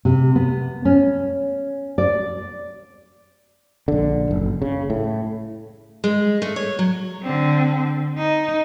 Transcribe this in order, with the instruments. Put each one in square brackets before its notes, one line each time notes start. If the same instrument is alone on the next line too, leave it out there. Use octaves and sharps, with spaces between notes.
[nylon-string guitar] C3
B3
C#4
D5
[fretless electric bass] A#1 D3
F#1
C#3
A2
[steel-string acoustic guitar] G#3
A3
C#5
F#3
[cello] D3 C4
D#4